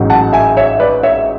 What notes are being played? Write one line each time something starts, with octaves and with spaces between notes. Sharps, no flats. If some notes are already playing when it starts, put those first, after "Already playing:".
Already playing: A1 G#2 F#3
F#5 A5
E5 G#5
C#5 E5
B4 D5
C#5 E5